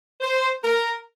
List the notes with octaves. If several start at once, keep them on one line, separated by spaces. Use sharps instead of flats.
C5
A#4